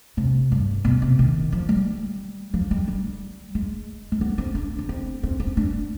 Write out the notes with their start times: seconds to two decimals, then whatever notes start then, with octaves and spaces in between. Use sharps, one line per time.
0.17 C3
0.52 G2
0.85 B2
1.02 C3
1.19 D#3
1.52 F3
1.69 G3
2.54 F3
2.71 G3
2.87 G3
3.55 G#3
4.12 G#3
4.21 B3
4.38 C4
4.55 D4
4.79 D4
4.89 C4
5.23 C4
5.40 C4
5.57 D4